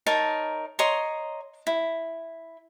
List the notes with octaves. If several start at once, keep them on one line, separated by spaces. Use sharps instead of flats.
D#4 A#4 C#5 A5
C#5 D#5 A#5 C6
E4